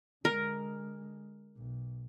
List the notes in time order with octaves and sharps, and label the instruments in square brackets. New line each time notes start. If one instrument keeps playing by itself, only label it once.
[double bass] D3 G#3 [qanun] A#4
[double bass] B1